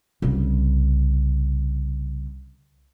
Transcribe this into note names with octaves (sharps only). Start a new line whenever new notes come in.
C2 C#3